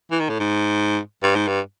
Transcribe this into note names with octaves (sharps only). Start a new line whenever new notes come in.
E3
D#3
A2
G#2
G2
G#2
G2